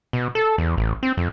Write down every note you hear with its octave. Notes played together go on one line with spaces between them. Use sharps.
B2
A4
E2
A1
C4
F2